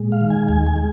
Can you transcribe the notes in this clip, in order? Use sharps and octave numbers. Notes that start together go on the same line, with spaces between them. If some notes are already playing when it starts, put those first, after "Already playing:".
Already playing: A#2 G#3
F5
D#3
G#5
D#2 G#5
G#5
G#3